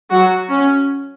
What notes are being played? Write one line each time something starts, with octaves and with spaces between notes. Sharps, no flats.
F#3 F#4
C#4